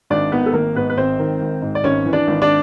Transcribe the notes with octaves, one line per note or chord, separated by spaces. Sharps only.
G#1 D4 D5
D#3 B3 B4
A4
G#1 A#3 A#4
G#2 B3 B4
B4
G#1 C4 C5
D#3
G#1
G#2
D5
G#1 C#4 C#5
E3
D4 D5
G#1
D4 D5